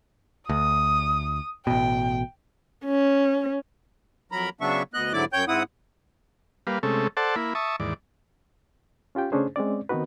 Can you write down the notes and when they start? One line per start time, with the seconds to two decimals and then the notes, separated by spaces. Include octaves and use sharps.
0.49 D2 D#6
1.67 A1 B2 G5
2.85 C#4
4.32 F2 F#3 A#4 A#5 B5
4.61 C#3 F#3 B3 D4 E5 C#6
4.94 D2 B3 D#5 F#6
5.13 G#2 D3 F#3 E4 D5 D6
5.33 F#2 C#5 G5 G6
5.48 G#2 C4 E4 F#5 D#6
6.67 G3 A#3 B4 F5
6.83 C3 G#3 A3 C#4 A4
7.17 A4 C5 D5 F#5 A5
7.36 A#3 E4 B5
7.55 E5 A5 C#6 D#6
7.80 D#2 G#2 E3 D5
9.15 C#4 F4 G4 G5
9.32 C#3 A3 C#4 D4 G#4 C5
9.56 G#3 C4 C#4 D5
9.89 D#3 B3 C4 D#4 F#4 B4